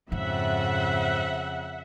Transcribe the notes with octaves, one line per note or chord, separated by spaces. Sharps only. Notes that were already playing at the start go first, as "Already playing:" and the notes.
F2 G#2 C#3 E5 F#5